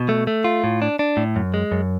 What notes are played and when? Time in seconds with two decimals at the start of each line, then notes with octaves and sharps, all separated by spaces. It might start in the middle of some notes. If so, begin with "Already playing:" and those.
Already playing: B2
0.09 A3
0.27 A3
0.44 F4
0.64 A2
0.82 D4
0.99 D4
1.17 A2
1.36 F#2
1.54 G#3
1.72 F#2